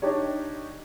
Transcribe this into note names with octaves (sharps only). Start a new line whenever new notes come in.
D4 D#4 G4 C#5